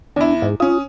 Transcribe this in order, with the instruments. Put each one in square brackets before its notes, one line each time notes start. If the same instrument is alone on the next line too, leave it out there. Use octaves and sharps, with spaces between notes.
[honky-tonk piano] E2 E4 [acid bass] D4
[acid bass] G#2
[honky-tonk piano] C#4 D#6 [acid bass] F4